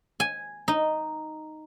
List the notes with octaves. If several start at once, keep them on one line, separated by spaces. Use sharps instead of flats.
G#5
D#4